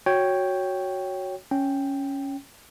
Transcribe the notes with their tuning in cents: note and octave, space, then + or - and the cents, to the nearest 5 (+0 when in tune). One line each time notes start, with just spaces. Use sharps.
F#4 +0 C#5 +0 G5 +0
C#4 +0 G5 +0